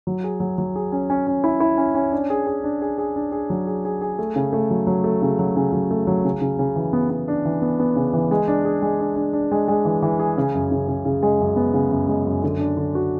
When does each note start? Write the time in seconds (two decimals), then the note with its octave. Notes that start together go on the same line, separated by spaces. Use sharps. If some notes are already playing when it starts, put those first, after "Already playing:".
0.07 F#3
0.24 G#4
0.40 F#3
0.58 F#3
0.76 G#4
0.92 C#4
1.10 C#4
1.27 C#4
1.44 E4
1.60 E4
1.77 C#4
1.95 C#4
2.12 D4
2.30 G#4
2.46 G#4
2.64 D4
2.82 G#4
2.98 G#4
3.16 D4
3.32 G#4
3.50 F#3
3.67 G#4
3.85 G#4
4.01 G#4
4.19 A3
4.36 C#3
4.53 A3
4.71 F#3
4.87 F#3
5.04 A3
5.22 C#3
5.39 F#3
5.56 C#3
5.72 F#3
5.91 A3
6.07 F#3
6.25 C#3
6.41 C#3
6.59 C#3
6.76 E3
6.93 B3
7.10 B3
7.28 D4
7.45 E3
7.62 B3
7.79 B3
7.96 C#3
8.13 E3
8.31 G#3
8.48 D4
8.65 G#4
8.82 G#3
9.00 D4
9.16 D4
9.33 D4
9.52 G#3
9.68 G#3
9.85 E3
10.02 E3
10.19 G#4
10.37 C#3
10.54 F#2
10.71 C#3
10.88 C#3
11.05 C#3
11.23 G#3
11.40 F#2
11.56 B3
11.74 C#3
11.91 F#2
12.08 G#3
12.25 F#2
12.43 D3
12.59 D4
12.77 D3
12.95 F#4